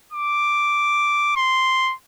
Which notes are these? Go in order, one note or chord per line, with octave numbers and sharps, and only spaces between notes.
D6
C6